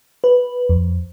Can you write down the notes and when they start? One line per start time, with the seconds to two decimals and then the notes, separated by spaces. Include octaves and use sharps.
0.24 B4
0.69 F2